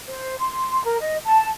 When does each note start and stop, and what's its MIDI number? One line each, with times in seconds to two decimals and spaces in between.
0.08 0.35 72
0.38 0.84 84
0.84 1.00 70
1.00 1.15 75
1.25 1.47 81